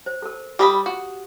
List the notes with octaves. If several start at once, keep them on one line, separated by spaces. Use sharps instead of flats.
C5
A4 A#4
G3 G4 A#5 B5 D#6
F#4